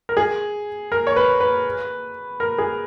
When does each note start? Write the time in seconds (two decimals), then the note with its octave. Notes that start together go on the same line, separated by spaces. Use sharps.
0.09 A#4
0.17 G#4
0.92 A#4
1.07 C#5
1.16 B4
1.40 B4
2.40 A#4
2.58 G#4